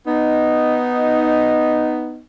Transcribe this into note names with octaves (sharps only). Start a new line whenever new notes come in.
B3 D#4